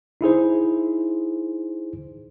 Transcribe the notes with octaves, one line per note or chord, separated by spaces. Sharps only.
D#4 E4 G#4 C5